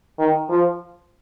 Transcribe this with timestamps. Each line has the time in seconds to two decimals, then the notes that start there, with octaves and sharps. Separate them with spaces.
0.19 D#3
0.50 F3